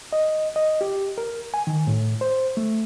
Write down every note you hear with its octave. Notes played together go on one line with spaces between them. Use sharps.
D#5
D#5
G4
A#4
G#5
D#3
A2
C5
A3